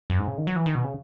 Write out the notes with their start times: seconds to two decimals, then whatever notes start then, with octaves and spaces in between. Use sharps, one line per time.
0.10 F#2
0.19 G#2
0.28 C#3
0.38 D#3
0.47 F#3
0.56 E3
0.66 D#3
0.75 B2
0.84 C#3